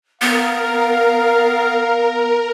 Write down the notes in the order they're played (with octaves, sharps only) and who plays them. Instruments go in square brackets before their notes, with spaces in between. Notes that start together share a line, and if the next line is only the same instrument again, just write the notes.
[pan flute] B3 [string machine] A#4 [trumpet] F5